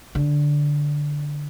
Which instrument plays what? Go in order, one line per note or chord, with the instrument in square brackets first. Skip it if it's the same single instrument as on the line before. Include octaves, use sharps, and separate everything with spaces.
[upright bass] D3